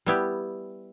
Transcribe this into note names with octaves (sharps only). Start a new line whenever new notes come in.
G3 B3 E4 G4